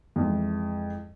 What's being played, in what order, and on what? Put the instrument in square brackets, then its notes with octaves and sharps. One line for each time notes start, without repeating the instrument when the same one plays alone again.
[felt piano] F2 E3 G#3